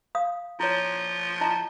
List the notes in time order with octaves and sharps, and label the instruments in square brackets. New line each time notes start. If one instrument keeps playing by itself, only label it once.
[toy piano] F5 D#6
[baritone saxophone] F3 [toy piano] E4 C#5
[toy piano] E4 D#5 A5